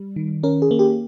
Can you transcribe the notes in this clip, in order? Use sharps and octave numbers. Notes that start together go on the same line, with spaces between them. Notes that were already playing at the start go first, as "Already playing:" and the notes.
Already playing: G3
D#3
C#4 A#4
G#4
A#3
G4